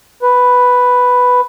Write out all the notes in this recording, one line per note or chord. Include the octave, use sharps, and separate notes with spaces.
B4